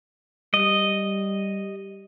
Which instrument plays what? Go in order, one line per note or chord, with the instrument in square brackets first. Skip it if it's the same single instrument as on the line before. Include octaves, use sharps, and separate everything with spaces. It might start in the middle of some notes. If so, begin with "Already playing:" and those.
[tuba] G3 [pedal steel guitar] D#5